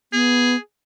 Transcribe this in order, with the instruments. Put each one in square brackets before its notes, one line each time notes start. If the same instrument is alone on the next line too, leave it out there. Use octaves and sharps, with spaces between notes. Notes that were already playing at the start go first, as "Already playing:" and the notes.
[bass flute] B3 [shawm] G#4